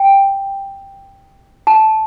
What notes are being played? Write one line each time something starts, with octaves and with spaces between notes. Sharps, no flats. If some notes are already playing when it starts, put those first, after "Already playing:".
Already playing: G5
A5